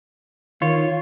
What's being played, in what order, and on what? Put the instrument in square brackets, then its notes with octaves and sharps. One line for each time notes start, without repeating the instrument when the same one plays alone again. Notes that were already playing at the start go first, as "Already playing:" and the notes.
[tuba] D#3 [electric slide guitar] F4 C#5